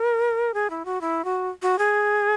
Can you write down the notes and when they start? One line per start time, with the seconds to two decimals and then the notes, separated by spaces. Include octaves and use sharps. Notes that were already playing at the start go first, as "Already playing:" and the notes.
Already playing: A#4
0.54 G#4
0.70 E4
0.85 F#4
1.01 E4
1.25 F#4
1.62 F#4
1.79 G#4